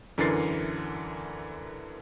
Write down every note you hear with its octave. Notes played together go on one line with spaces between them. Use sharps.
F#2 D3 E3 A#4 A6 C7